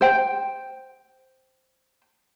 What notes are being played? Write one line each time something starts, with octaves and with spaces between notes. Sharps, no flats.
C5 G5